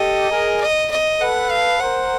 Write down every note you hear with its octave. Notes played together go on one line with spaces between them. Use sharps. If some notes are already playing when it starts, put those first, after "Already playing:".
Already playing: G4 A4 D#5
G#4 A#4
D#5
D#5
A4 B4 F#5
F5
A#4 C5 F#5